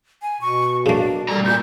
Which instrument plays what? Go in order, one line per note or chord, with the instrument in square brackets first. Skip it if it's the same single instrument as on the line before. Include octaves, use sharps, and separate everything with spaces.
[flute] G#5
[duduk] B2 [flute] C#6
[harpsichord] C#3 A#3 [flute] D4
[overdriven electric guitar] A#2 A#5 [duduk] G3 [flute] A4
[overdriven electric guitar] B1 A#2 [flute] G6